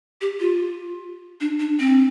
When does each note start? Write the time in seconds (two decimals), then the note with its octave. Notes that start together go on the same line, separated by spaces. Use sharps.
0.21 G4
0.40 F4
1.41 D4
1.60 D4
1.80 C4